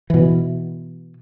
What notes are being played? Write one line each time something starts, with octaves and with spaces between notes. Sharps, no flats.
B2 E3